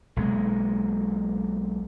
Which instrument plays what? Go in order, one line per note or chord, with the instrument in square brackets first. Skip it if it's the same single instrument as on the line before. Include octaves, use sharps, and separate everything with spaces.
[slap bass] B1 G#3 A#3